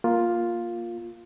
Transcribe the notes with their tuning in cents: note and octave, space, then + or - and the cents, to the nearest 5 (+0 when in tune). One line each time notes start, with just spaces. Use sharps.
A#3 +5 F4 +5